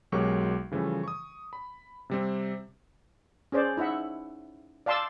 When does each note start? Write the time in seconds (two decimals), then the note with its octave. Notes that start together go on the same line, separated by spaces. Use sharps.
0.12 B1 F#3 G#3 G4 A#4 C#6
0.71 C#3 E3 F3 G3 A3
1.03 C#6 D#6
1.53 B5
2.10 C3 G3 C4
3.52 C#4 G#4 C5 D5
3.77 D#4 E4 E5 F#5
4.86 D5 F5 A5 C6 D6 E6